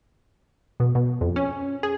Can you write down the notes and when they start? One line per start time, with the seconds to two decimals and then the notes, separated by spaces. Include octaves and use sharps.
0.80 B2
0.95 B2
1.21 F2
1.36 C#4
1.83 G#4